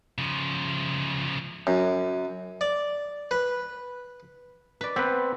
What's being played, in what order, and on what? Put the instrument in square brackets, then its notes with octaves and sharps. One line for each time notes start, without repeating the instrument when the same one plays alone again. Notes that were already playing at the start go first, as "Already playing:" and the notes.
[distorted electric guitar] C#3 F3
[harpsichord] F#2
D5
B4
[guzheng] B4 D5
[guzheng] B3 [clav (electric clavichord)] C4 B4